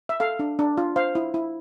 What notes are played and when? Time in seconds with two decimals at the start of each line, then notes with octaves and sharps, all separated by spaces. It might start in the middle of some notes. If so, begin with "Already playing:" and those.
0.09 E5
0.20 A4 F5
0.39 D4
0.59 D4
0.78 F4
0.96 C5 F5
1.15 E4
1.34 E4